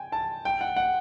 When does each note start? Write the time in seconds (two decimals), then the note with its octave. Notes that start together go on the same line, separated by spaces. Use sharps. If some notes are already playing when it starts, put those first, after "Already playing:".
Already playing: G5 G#5
0.12 A5
0.45 G5
0.61 F#5
0.76 F#5